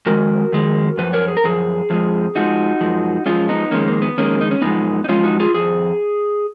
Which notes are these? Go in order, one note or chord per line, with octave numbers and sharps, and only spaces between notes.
F2 D#3 G#3 F#4 A#4
F2 D#3 G#3
F#2 F3 B4
A#4 C#5
G#4
A#4
F#2 F3 G#4
F2 F3 G#3
F2 F3 G#3 D#4 F#4
F#2 F3 G#3
F#2 F3 G#3 C#4 F4
B3 D#4
F2 D#3 G#3 A#3 C#4
A#3
B3
F2 D#3 G#3 A#3 C#4
D#4
C#4
F#2 F3 G#3 B3 D#4
D#4
F#2 F3 G#3 C#4 F4
D#4 F#4
F4 G#4
F2 F3 G#4